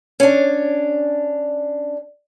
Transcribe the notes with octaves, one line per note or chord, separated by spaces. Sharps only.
C#4 D4